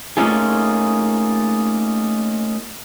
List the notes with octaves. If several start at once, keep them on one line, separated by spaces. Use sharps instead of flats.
A3 A#3 C#4 D#4 F4 G#4